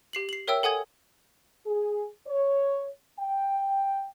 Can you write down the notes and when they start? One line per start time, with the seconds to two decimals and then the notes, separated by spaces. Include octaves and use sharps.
0.13 G4 C7 F#7
0.29 C7 F#7
0.47 A#4 C#5 E5 G5 E6
0.63 A4 F#5 G#5 D#6 G#6
1.66 G#4
2.27 C#5
3.20 G5